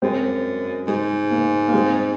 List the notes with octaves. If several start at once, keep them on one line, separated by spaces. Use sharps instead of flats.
F#2 G#3 C4
G#2 G#3
A#3
A#3
G#3 C4